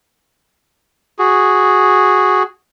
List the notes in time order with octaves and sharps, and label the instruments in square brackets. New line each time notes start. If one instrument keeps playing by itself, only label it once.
[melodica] F#4 G#4